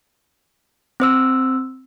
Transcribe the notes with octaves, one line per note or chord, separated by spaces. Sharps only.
C4 C5 E6